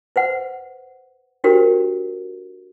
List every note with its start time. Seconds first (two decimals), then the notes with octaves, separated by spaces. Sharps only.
0.16 B4 C5 F#5
1.44 D4 F#4 G4 A#4 C5